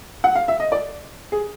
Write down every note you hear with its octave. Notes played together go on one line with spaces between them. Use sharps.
F#5
F5
E5
D#5
D5
G#4